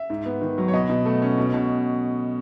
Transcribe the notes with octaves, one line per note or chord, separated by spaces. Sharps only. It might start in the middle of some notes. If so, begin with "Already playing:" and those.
Already playing: E5
G#2
B3
D#3
F#3
C#5
B2 D#5
B2
A3
C#4
B2
B2